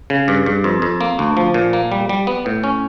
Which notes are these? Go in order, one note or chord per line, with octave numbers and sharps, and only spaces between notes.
C#3
G2
G2
F2
F2
A#3
D2
F3
A#2
A#3
G3
G3
B3
A2
C#4